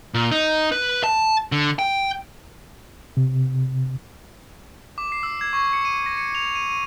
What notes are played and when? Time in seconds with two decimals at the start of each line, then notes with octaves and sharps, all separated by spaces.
0.14 A#2
0.31 D#4
0.72 B4
1.04 A5
1.52 D3
1.79 G5
3.17 C3
4.98 D6
5.12 C7
5.23 E6
5.41 G#6
5.53 C#6
5.73 C#7
5.85 D#7
6.06 A#6
6.18 C#7
6.35 F7
6.55 D#7
6.70 D#7